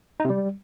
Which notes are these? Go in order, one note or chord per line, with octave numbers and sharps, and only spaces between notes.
D#4
C3
G3